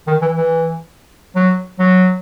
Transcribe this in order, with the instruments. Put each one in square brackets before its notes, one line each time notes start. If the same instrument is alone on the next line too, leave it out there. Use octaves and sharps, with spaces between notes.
[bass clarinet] D#3
E3
E3
F#3
F#3